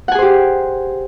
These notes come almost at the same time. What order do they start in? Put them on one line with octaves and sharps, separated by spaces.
F#5 G#5 G#4 C5 G4